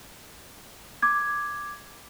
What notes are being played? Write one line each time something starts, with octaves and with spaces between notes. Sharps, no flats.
D6 G#6